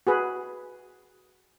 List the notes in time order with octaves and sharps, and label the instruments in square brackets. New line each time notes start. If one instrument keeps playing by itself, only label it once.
[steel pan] F#4 G#4 B4